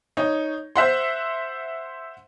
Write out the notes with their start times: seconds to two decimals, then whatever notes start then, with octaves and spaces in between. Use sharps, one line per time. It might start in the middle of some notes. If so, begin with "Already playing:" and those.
0.17 D#4 C#5
0.76 C5 E5 F#5 C6